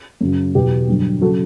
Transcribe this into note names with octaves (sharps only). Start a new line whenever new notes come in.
F#2 C#3 F#3
E2 B2 F#3 G4
G2 D3 F#3
C#3 F#3 F#4 A4